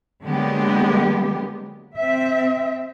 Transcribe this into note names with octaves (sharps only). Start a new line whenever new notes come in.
D3 F#3 G#3 A#3 B3 G4
C4 E5